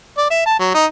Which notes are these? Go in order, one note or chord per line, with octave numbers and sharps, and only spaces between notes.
D5
E5
A5
F#3
D#4